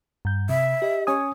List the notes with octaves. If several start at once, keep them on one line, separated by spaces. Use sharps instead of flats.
G2 G6
C3 E5
G4 D#5
C#4 C#5 G#5 D#6